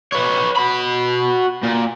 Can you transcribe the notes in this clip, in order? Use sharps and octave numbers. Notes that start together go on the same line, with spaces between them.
B4 C#5
F#4 B5
A#2